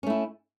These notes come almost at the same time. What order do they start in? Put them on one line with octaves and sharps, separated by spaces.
C#4 A3 E4